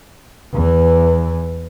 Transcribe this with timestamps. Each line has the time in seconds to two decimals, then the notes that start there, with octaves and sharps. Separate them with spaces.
0.53 E2 E3